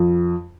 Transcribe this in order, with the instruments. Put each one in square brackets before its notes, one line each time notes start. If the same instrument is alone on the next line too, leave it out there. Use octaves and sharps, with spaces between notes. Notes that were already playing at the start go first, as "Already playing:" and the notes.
Already playing: [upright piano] F2